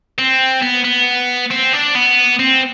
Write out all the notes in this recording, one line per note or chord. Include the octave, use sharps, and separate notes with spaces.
C4
B3
B3
C4
D4
B3
C4